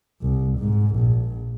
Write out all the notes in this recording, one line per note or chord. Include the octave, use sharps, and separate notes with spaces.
C2
G#2
A#1